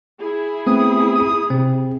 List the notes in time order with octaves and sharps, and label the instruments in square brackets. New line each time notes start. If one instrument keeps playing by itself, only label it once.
[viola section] E4 G#4
[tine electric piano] A3 B3 C4 [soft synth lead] D#6
[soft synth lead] D#6
[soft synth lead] C3 [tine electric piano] C4